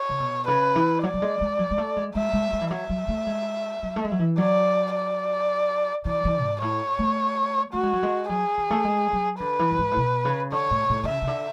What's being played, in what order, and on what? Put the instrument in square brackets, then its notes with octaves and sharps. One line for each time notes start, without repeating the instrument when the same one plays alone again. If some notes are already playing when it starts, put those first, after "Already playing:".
Already playing: [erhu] C#5
[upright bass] C#3
B2
[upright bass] C#3 [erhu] B4
[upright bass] E3
[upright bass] F#3 [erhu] D5
[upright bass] F#3
G#3
G#3
F#3
G#3
A3
G#3
[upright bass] G#3 [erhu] E5
[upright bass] G#3
G#3
E3
[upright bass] F#3 [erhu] E5
[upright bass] F#3
A3
G#3
F#3
A3
G#3
F#3
E3
[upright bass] F#3 [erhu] D5
[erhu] D5
[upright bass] E3 [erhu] D5
[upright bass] E3
G#2
[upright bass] A2 [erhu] C#5
[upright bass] A3
[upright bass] A3 [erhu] F#4
[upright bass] G#3
F#3
G#3
[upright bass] F#3 [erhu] G#4
[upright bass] E3
A3
G#3
F#3
[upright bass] D3 [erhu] B4
[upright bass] E3
F#2
G#2
A2
B2
C#3
[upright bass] D3 [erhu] C#5
[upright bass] A2
A2
D3
[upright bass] C#3 [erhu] E5
[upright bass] C#3
D3